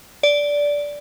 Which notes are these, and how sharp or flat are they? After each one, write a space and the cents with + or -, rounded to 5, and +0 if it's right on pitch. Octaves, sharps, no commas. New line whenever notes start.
D5 -10